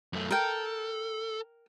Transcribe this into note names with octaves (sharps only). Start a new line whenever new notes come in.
F#2 A3
A4 A#4 G5